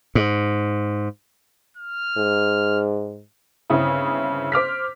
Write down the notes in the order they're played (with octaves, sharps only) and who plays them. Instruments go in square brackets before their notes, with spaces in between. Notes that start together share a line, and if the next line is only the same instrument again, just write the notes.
[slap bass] G#2
[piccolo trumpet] F6
[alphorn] G#2
[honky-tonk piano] G1 C#3 C4 E4 D#6
C5 D6 F6 B6